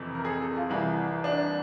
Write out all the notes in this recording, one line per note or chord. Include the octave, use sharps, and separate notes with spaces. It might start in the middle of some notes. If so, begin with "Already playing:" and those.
Already playing: F2 C3 E3 A4
A#4
G#4
A4
A4
F4
C2 C3 E3 E4
D4